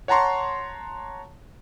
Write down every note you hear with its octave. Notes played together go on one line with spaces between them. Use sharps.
C#5 F#5 A5 A#5 C6 C#6